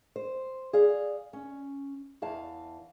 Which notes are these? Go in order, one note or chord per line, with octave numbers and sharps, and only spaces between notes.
C5
G#4 D5 F5
C#4
E2 E3 F5 A5